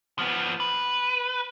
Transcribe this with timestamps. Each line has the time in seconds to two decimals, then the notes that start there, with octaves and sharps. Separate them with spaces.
0.19 F3 B3
0.60 B4